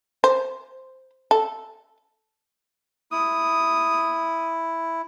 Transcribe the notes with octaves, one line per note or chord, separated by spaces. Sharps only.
C5
A4
E4 D#6